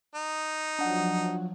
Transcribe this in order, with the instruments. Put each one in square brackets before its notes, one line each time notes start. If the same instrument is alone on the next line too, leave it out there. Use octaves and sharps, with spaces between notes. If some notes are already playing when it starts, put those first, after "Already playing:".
[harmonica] D#4
[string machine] F3 F#3 [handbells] D4 F#5